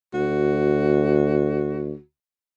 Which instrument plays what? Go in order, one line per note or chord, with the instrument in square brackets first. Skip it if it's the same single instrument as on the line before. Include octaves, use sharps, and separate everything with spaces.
[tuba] D2 [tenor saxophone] F#4